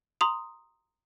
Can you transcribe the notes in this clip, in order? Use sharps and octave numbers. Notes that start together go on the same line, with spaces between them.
A#5 C6 D#6 F7